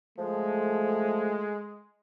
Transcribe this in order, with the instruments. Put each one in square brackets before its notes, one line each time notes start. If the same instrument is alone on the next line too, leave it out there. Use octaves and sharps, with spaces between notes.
[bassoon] F3 [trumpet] G#3 [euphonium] A3